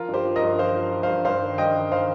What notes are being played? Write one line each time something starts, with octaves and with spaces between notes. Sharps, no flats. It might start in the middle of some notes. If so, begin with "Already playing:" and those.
Already playing: F3 F4 A#4
G2
G4 C5
F3
A#4 D#5
G2
F3 C5 F5
F3
F3
G2 C5 F5
G2 C5 F5
D#3
G2 D#5 G5
D#3
D#3 C5 F5